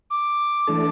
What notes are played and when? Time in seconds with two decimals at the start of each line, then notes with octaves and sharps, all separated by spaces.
0.10 D6
0.67 E3 A3 D4 A4